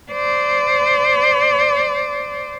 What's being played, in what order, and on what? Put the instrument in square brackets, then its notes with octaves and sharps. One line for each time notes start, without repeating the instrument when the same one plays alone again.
[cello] C5 D5